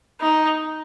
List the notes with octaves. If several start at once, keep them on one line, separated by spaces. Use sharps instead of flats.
D#4